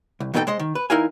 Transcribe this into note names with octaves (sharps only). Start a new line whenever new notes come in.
C2
E2 B2 D#4 G#4 A4 G5
G#3 C5 D#5
D#3
B4
E2 D#4 E4 A#4 F5 G#5